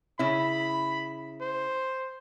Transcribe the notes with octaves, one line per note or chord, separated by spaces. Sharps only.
C#3 E4 B5
C5